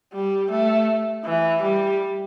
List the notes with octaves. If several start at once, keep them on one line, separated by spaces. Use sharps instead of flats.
G3
A3
E3
G3